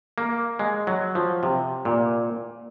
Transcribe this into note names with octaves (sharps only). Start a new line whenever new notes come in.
A#3
G#3
F#3
F3
C3
A#2